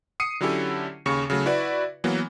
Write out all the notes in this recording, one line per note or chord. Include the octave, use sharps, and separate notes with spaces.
D#6 C7 C#7 D#7
D3 F#3 C#4 E4 G4 A4
D#2 C#3 C#6 C#7
C#3 F#3 A3
E4 F#4 B4 D5
E3 F#3 A#3 B3